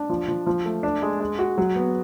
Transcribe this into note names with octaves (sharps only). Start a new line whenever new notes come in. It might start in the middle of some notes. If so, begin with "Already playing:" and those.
Already playing: D4
F3
F3
F3
A3
D4
G#3
G#3
F#4
F#3
B3